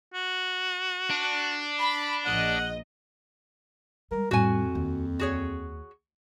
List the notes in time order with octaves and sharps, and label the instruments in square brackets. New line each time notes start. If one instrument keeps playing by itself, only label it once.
[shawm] F#4
[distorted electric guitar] D4
[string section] B5
[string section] A#1 D#5 [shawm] F#5
[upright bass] G3 G#3 [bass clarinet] A#4
[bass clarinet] F2 [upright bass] A2 G3 [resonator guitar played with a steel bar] F#4 G#5
[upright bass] D#2
[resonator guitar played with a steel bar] F#4 G#4 C#5